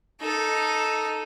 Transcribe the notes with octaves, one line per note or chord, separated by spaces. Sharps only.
D#4 A4